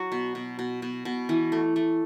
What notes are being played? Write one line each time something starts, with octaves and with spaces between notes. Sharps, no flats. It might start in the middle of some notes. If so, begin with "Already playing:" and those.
Already playing: F#3 F#4
B2
B2
B2
B2
B2
E3
A3
A3